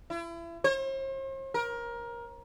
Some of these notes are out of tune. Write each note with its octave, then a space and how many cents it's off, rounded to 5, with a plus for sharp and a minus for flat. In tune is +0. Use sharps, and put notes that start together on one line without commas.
E4 +35
C5 +45
A#4 +20